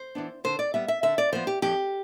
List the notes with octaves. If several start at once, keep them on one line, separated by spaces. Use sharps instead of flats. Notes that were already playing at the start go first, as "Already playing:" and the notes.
Already playing: C5
E3 B3 D4
D3 C5
D5
G3 B3 E5
E5
D3 E5
D5
F3 B3 C5
G4
F2 G4